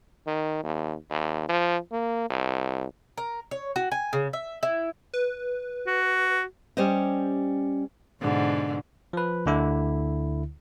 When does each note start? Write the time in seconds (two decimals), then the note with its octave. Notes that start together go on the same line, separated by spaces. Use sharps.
0.27 D#3
0.63 D#2
1.11 D#2
1.49 F3
1.92 A#3
2.30 C2
3.18 A#4
3.51 C#5
3.76 F#4
3.92 G#5
4.13 C#3
4.33 E5
4.63 E4
5.14 B4
5.87 F#4
6.77 G3 C#4 G4 C5 D#5
8.20 G#2 B2 D3
9.13 F3 B4
9.46 D2 D3 E4